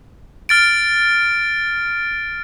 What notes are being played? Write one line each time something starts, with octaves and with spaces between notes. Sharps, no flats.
F6 A6 D7